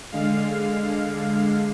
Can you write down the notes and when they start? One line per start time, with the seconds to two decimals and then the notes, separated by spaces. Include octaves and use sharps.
0.12 D3 G#3 F5